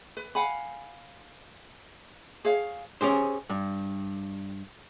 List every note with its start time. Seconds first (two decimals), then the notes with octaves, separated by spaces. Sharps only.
0.17 B4
0.35 F5 F#5 G#5 B5
2.45 G#4 C#5 F5
3.01 C#4 G4 G#4 C5
3.50 G2